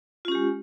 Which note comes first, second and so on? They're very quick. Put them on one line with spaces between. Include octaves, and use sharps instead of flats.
F4 C#4 G4 G#3